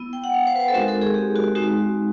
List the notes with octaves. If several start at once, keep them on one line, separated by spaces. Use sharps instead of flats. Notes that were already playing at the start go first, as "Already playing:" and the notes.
Already playing: B3 E4
G5
F#5
F5
C5
B4
C5
A4
G#3 C4 D#4 F#4 A#4
A4
G#4
G4
F#4
G#3 C4 D#4 F#4